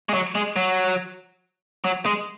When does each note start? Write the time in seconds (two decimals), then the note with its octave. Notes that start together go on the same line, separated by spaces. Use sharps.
0.09 G#3
0.14 F#3
0.35 G#3
0.56 F#3
1.84 F#3
2.06 G#3